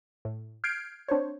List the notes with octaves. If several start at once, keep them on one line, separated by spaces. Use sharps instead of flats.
A2
F6 G6 G#6 C7 D7
C4 D4 C5 C#5